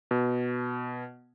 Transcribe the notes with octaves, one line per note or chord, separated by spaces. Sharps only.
B2